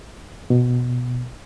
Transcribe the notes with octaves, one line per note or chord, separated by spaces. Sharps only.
B2